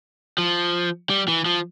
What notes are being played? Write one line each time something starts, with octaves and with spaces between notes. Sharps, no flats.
F3
G3
E3
F3